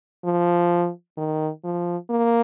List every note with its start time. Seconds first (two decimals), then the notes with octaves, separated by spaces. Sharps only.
0.25 F3
1.17 D#3
1.64 F3
2.10 A#3